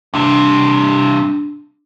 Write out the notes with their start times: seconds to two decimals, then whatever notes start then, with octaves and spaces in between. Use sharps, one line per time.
0.14 G2 C3 D4